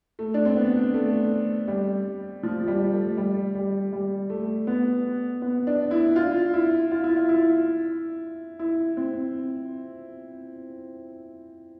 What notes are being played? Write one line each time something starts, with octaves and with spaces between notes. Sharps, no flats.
A3
D4
C4
B3
A3
G3
F3
G3
A3
G3
G3
G3
A3
B3
B3
D4
E4
F4
E4
F4
E4
F4
E4
E4
C4